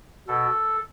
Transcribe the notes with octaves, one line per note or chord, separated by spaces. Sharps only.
B2 A4